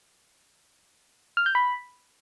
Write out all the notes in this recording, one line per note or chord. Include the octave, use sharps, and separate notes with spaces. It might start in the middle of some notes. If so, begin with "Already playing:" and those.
F6
G6
B5